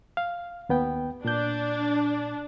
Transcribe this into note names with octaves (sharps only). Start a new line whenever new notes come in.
F5
D#2 B3 G5
A#2 D4 G6